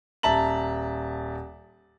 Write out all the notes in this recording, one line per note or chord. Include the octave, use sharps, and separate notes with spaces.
D#1 E5 A5 A#5 F#7